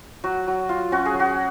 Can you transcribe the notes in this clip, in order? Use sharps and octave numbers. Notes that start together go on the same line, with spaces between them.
F#3 F#4
F#3
F4
C#4 F#4
G#4
F#3 F#4